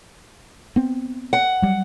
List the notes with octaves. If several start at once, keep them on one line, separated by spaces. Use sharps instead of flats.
B3 C4
F#5
F#3 G3